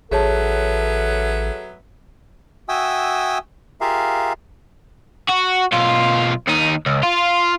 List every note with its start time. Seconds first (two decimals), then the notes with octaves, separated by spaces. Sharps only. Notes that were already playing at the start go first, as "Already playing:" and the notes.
0.11 A1 F#3 B3 G#4 A4 C#5 E5 A5
2.69 F#4 E5 G5 G#5 D#6 E6
3.81 F4 G4 G#4 A#4 E5 F5
5.29 F#4
5.73 B1 F4
6.48 D#2 D#4
6.86 C#2
7.03 F4